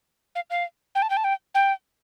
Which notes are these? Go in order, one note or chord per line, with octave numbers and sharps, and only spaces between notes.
F5
F5
G5
A5
G5
A5
G5
G5